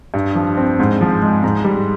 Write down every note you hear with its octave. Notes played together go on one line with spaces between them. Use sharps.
G2
F3
C4
G#2
F3
G#3
G#2
G3